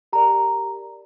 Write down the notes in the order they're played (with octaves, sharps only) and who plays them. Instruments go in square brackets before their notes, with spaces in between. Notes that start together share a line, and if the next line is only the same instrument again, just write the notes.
[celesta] G4 A#4 D5 A#5